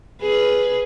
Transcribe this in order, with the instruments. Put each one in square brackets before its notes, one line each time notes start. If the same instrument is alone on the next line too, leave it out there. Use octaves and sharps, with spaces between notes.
[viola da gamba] G#4 B4